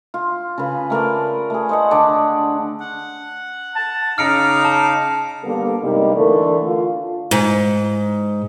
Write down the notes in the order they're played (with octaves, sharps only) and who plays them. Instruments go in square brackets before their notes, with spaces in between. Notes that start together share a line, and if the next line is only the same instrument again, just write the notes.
[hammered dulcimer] F4
C#3 B4
A3 A#4 B4 D5
A3 G#4
C5 D#5 F#5
D3 D4 D5
[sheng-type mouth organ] F#5
[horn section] A5
[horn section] C#3 A#5 [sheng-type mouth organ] D#4 F5 D6 [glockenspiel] F6 C#7 D7
[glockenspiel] A5
[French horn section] D3 G3 A#3 B3 A4
G2 C3 G3 G#3 A#3 D#4
D3 E3 A3 A4 A#4 D5
D3 F4
[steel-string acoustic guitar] G#2